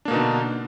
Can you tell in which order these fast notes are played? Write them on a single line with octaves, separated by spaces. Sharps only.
D4 A#3 B2 D#4 D3